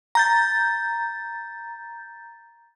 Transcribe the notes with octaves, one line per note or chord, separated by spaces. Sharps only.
A#5 G6 A6